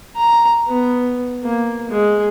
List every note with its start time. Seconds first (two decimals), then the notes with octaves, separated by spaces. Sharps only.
0.16 A#5
0.68 B3
1.43 A#3
1.89 G#3